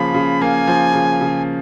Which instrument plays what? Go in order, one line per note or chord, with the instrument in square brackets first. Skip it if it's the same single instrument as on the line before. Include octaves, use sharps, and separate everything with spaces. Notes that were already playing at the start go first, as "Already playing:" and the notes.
Already playing: [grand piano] C#3 F3 A#3 [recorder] B5
[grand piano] C#3
[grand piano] A#3 [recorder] G#5
[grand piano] F3
C#3
C#3